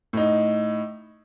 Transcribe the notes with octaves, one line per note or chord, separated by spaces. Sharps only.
A2 D#4